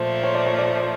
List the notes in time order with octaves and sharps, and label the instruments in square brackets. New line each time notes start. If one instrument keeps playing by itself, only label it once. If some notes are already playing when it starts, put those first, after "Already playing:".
Already playing: [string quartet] A#2 F3 A3 [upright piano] C5
[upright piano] C#5
D5
C#5
D5